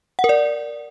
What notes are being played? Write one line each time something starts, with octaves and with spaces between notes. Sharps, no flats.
F#5
A#4
D5